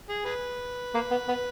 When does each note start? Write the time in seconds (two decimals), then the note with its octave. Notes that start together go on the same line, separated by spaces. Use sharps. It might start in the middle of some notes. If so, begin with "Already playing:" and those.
0.09 G#4
0.26 G#4 B4
0.94 A#3
1.11 B3
1.28 B3